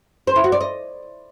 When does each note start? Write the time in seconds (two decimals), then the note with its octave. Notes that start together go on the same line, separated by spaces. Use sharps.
0.27 C5
0.36 E4
0.44 F#4
0.52 D5
0.61 D#5